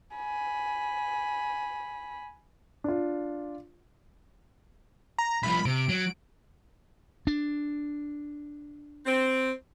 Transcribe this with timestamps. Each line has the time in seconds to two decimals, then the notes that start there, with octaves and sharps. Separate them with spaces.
0.16 G#5 B5
2.84 D4 F4
5.18 A#5
5.43 C2 F3 B5
5.65 C3 D7
5.89 F#3
7.27 D4
9.06 C4